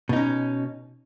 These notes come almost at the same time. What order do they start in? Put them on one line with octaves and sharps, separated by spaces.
B2 D#4 C#4